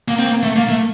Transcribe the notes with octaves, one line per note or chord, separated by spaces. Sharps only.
A#3
C4
A#3
A3
A#3
A3